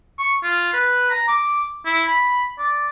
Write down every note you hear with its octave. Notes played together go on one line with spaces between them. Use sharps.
C#6
F4
B4
A#5
D6
E4
B5
D5